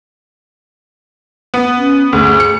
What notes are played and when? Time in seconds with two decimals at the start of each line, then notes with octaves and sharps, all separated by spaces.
1.54 B3
1.78 C#4
2.13 D2 G#4
2.40 C#7